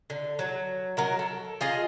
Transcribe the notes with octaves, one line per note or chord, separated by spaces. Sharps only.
D3
F#3
F#3 A#4 F#5
A4
F4 G#4 D#5